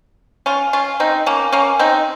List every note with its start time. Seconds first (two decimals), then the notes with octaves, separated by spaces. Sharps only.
0.46 C#4 F4
0.73 C#4 F4
1.00 C4 D#4
1.26 A#3 C#4
1.52 A#3 C#4
1.79 C4 D#4